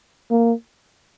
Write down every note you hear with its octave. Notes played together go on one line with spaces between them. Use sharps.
A#3